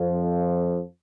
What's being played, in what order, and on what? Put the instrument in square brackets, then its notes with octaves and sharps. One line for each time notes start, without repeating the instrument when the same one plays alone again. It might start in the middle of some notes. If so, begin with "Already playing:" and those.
Already playing: [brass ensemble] F2 F3